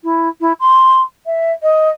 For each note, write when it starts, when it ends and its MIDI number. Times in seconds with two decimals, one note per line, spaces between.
0.04 0.28 64
0.41 0.53 64
0.60 1.01 84
1.26 1.52 76
1.62 1.89 75